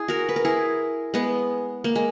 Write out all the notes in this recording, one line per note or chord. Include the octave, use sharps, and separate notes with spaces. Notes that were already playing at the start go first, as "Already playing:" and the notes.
Already playing: E4 G#4
F#4 A#4
B4
A#4
E4 G#4
G#3 B3
A#3
G#3